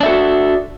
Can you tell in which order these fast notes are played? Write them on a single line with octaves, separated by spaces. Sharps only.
D4 E5 A4 F#4